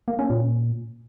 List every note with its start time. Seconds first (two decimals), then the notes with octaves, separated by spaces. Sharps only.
0.08 A#3
0.19 C#4
0.30 A#2